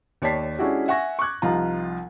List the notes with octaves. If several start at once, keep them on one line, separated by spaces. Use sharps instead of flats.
D#2 C#5 D5 A5 B6 C7
G#3 C#4 D4 E4 F#4 G4
E5 F#5 G#5 C#6 A#6
C#6 D6 F#6 G#6
C2 F3 D#4 F4 A#5